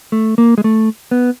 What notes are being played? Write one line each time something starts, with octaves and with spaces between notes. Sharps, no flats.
A3
A#3
G#3
A3
B3